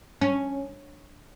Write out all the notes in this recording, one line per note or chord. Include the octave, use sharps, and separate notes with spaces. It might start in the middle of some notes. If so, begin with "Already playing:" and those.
C#4